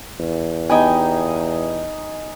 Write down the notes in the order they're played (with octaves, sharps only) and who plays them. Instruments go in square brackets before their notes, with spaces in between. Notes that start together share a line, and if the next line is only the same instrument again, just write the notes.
[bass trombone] E2
[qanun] B3 G4 G5 [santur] D#4 G#5